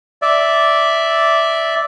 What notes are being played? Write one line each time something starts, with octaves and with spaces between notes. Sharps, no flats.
D5 E5